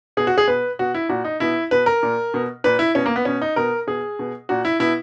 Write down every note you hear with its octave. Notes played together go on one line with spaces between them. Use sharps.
B2 G#4
F#4
G#4
B2 B4
B2 F#4
E4
A#2 F#4
D#4
B2 E4
B2 B4
A#4
A#2
B2
A#2 B4
E4
B2 C#4
A#3
B3
B2 C#4
D#4
B2 A#4
B2 G#4
B2
A#2 F#4
E4
B2 E4